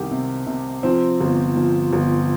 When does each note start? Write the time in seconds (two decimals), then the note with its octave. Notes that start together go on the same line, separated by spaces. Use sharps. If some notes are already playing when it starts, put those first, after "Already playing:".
Already playing: C2 D#3 G4
0.11 C3
0.47 C3
0.83 F3 C4
1.20 G1
1.56 F3
1.93 G1